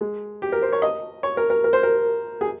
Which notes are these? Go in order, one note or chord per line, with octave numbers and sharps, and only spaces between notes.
G#3
G4
A#4
C5
C#5
D#5
C#5
A#4
A#4
A#4
C5
A#4
G#4